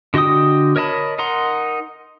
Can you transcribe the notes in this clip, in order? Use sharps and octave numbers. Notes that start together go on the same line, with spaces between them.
D3 F#4 D#5 G5 D#6
A#4 C#5 D#5 A5 B5
D#4 A#4 F#5 A#5 C6